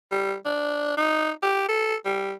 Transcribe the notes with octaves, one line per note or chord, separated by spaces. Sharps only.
G3
D4
D#4
G4
A4
G3